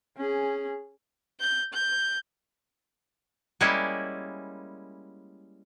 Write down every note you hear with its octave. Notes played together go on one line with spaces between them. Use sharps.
C#4 G#4
G6
G6
G3 G#3 A#3 C#4 E4